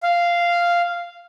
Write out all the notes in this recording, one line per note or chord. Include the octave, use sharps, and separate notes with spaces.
F5